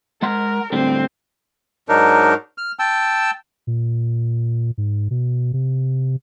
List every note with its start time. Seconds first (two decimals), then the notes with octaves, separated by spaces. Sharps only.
0.22 G#3 A#4 F#5 C6
0.73 A2 D3 G3 C4
1.89 G#2 F#3 D4 D#4 A#4
2.58 F6
2.79 G5 A5 E6
3.67 A#2
4.78 G#2
5.11 B2
5.53 C3